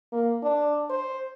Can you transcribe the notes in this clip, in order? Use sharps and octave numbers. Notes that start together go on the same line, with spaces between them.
A#3
D4
C5